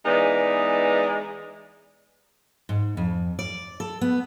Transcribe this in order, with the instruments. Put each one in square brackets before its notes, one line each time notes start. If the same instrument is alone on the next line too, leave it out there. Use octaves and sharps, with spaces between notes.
[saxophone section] E3 G#3 B3 D#4 D5 D#5
[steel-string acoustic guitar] G#2
F2
D5
A4
B3